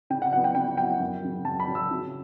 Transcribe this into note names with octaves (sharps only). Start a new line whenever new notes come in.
C#3 G5
F#5
F#3 B3 E4 F#5
G5
C#3 G5
F#3 B3 E4 G5
F#2
C#3 F#3
F#2 A5
B5
C#3 F#3
E6
C#3